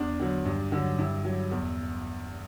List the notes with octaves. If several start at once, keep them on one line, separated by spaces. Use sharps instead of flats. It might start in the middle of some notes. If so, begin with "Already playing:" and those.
Already playing: E2 D4
D3 F#3
G2
D3 F#3
G2 E4
F#3
E2